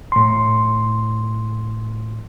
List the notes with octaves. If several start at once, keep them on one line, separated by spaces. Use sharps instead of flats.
A2 C6